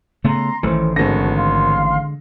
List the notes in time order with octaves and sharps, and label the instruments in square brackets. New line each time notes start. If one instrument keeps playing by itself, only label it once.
[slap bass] C#3 A3 B3 [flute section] A#5 C6
[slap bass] A1 D#3 [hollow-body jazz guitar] E3 A3 [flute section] C5
[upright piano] G#1 A#6 [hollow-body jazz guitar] D3 G#3 [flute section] F#4 A4
[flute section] F5 C6